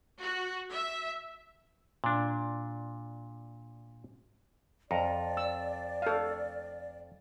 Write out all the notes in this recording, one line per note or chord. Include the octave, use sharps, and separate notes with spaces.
F#4
E5
A#2 D4
F2 D5 A#5
E6
A4 F5